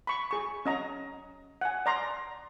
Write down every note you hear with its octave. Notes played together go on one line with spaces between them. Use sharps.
B5 C#6
G#4 C#6
C#4 D#5 A#5
F#5 G#5
D5 A#5 C6